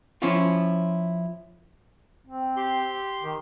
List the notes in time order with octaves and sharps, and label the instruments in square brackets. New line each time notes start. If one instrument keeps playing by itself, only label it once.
[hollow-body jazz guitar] F3 C#4 E4 F4
[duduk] C4
[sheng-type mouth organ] G4 C6
[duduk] D#3